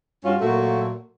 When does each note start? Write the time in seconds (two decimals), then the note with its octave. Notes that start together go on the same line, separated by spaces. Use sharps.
0.24 G2 G3 C#4 F4 F#4
0.41 A#2 F#3 A3 A#3 F#4